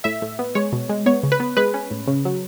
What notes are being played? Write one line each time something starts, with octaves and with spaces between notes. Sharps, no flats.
A2 E5
A2
B3
G#3 C#5
B2
G#3
B3 C#5
C#3
B4
B3
G#3 B4
C#4
A2
C#3
F#3